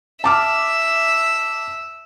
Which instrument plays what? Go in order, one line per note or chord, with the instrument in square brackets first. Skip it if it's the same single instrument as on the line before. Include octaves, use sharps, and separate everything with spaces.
[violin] E5 [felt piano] A5 D6 F6